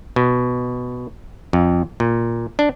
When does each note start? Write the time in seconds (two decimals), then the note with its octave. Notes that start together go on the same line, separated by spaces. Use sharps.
0.16 B2
1.53 F2
2.00 A#2
2.59 D4